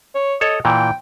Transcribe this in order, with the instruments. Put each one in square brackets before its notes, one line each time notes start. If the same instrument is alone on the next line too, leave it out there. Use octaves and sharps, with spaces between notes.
[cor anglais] C#5
[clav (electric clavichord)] A4 C#5 [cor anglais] D#5
[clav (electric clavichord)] A#2 E3 [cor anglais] G5